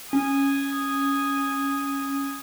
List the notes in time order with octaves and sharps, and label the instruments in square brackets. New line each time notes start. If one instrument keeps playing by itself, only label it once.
[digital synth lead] C#4 [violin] G#5 D#6